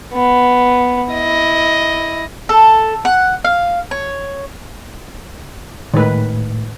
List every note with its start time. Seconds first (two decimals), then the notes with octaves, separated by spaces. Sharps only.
0.13 B3
1.12 E4 D#5
2.49 A4
3.05 F#5
3.44 F5
3.91 C#5
5.94 A2 D#3 G#3 B4